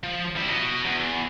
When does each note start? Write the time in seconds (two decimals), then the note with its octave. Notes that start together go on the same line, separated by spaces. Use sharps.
0.03 F3
0.36 G3 E4
0.50 F#4 D#5
0.85 E2